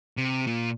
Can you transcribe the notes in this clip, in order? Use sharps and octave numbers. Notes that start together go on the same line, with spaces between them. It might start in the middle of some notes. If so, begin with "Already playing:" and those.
C3
A#2